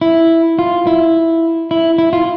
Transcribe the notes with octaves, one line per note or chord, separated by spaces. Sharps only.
E4
F4
E4
E4
E4
F4